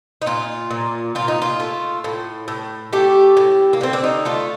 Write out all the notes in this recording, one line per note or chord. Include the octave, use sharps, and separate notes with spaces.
D#4
A#2 F4
A#2
A#2 F4
D#4
F4
A3
A2
A2
A3 G4
A2
A#3
D3 C4
D4
D#4
A3 F4